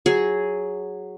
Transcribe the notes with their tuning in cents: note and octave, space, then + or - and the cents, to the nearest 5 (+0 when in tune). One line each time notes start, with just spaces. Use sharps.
F#3 +0 G#4 +0